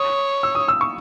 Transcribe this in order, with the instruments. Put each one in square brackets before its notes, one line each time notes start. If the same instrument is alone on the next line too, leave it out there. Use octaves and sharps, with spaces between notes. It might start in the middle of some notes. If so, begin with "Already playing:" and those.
Already playing: [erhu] C#5 [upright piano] D#6
[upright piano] E6
D#6
E6
C#6